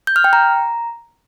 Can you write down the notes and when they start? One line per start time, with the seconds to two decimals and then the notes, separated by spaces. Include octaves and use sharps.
0.07 G6
0.16 F6
0.24 G5
0.33 A#5